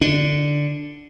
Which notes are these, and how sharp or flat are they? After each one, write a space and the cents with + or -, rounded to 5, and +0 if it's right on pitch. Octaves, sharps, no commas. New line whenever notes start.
D3 +0 D4 +0